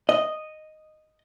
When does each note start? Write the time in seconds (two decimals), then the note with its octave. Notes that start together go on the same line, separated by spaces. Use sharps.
0.09 D#5